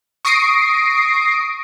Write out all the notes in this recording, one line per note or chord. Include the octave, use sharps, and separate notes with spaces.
C#6 D#6 A#6 C7 D7